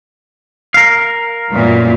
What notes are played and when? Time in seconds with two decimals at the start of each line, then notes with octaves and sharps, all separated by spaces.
0.74 A#4 F5
1.50 F#2 A#2 E3